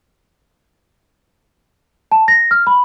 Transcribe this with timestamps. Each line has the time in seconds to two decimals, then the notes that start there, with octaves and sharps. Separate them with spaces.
2.12 A5
2.28 A#6
2.51 F6
2.67 B5